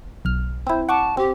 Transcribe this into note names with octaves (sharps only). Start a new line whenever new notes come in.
B1 F6
C4 E4 C5
F#5 A5 C#6 D6
C4 G4